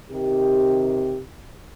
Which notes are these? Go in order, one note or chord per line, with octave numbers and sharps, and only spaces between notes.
C3 D#3 G4